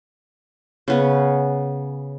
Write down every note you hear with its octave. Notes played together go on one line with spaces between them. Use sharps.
C#3 B3